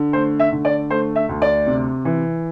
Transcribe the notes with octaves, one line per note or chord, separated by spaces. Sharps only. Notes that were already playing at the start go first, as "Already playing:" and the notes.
Already playing: D3
A3 C5
E5
D3
D5
A3 C5
E5
D2
D5
C3
E3